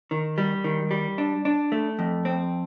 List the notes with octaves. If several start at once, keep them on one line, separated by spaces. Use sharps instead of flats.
D#3
G3
D#3
G3
D4
D4
A3
F2
C4